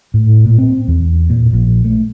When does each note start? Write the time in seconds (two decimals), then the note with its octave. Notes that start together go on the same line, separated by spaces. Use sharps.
0.14 A2
0.45 A#2
0.58 C4
0.88 E2
1.30 A#2
1.53 A#1
1.84 A3